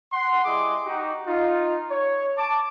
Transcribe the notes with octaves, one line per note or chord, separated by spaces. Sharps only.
F#5 C6
G3 E4 G#4 D#5 C6 D6
D#4 F#4 G4
D#4 F4
C#5
A5 D6